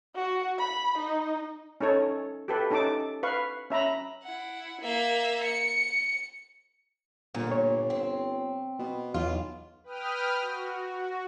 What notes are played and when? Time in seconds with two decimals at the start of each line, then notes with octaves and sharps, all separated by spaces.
0.15 F#4
0.59 B5
0.98 D#4
1.81 C#4 D#4 A4 C#5
2.48 G4 A4 B4
2.71 C#4 D#4 A4 A5 D6
3.23 B4 F5 C#6
3.70 C#4 E5 A#5 B5
4.23 E4 F#5
4.81 A#3 E5
5.44 C#7
7.35 G1 A#2
7.52 C#5
7.90 C4
8.79 B2
9.14 B1 E2 F4
9.84 B4 G5 D#6 F6
10.41 F#4